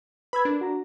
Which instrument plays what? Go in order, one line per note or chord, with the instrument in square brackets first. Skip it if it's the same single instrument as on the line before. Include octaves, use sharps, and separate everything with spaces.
[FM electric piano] B4 [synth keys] B5 E6 G#6
[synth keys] D4 [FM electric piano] A#4
[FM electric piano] F#4 A#5